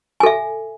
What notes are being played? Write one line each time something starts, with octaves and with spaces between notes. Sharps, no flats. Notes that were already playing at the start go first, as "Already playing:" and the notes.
A4 E5 G#5